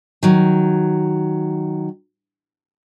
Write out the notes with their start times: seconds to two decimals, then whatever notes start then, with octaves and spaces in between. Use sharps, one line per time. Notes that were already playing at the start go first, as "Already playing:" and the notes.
0.23 D#3 F#3